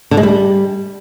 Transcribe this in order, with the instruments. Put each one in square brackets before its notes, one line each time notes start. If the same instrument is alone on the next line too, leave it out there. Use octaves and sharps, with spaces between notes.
[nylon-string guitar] D3
G#3
G3